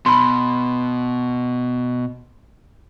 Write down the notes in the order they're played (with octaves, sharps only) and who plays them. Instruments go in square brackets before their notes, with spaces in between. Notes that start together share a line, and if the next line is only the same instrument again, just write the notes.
[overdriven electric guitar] B2 [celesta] B5 C6